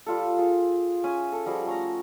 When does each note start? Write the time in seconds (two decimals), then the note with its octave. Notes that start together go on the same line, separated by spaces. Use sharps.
0.06 G3 F4 A4
0.38 F4 G#4
1.04 C#4 E5 G#5
1.32 A4
1.46 F3 G3 F#4 G#4
1.66 A3 C#4 A#5